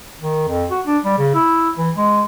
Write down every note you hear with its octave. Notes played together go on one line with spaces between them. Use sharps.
D#3
F2
F#4
D4
G3
C#3
E4
E3
G#3